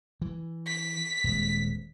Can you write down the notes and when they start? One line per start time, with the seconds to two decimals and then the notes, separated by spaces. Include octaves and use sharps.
0.22 E3
0.67 B6
1.24 D#1 G#3